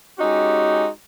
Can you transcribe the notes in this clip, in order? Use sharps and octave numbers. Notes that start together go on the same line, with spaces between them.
G#3 C#4 D#4 F#4 G4